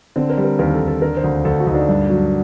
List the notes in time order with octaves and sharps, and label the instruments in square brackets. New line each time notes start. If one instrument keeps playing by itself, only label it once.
[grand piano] D3 C4
A#4
G3
A#4
D#2 A#4
A4
D#2
A4
D3 A#4
C5
D2
D2 A4
F#4
D2 D#4
D4
G2
F#3